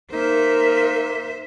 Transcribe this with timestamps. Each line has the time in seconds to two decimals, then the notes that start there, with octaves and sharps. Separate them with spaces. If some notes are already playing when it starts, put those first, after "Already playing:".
0.11 A#3 D#4 A#4 C5 E5